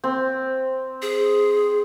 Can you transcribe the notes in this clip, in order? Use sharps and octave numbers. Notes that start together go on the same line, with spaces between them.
C4
G#4